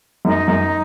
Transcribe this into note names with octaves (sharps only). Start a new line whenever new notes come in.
F#2 D#4
F#2